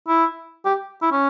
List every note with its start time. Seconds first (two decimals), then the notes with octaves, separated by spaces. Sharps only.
0.08 E4
0.65 G4
1.02 E4
1.12 C#4